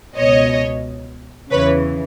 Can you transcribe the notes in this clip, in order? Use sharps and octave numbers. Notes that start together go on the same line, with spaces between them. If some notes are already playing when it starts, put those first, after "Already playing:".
C#2 B2 C#5 D#5
E2 C#3 E3 B4 C#5